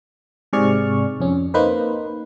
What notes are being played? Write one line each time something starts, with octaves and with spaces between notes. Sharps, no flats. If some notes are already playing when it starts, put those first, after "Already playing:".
G#2 C3 G#4 D5 C#6 F6
F2 C#4
A#3 D#4 B4 C5